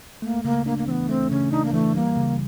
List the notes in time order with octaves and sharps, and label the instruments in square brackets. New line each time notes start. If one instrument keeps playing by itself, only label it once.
[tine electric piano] A3 [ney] A#3
[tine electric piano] C#3 [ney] A#3
[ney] A#3 [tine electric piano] D4
[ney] A#3
[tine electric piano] E3 [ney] B3 C4
[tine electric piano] A3 [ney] C4
[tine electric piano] C#3 [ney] C#4
[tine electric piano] D4 [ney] D#4
[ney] A#3
[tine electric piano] E3 [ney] A3
[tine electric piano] G3 [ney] A#3
[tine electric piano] C#3